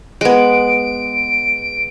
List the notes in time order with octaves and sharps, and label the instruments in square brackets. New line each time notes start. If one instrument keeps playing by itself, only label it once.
[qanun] G#3 B3 [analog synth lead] D7